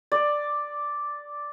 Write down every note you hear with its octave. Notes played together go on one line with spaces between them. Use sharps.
D5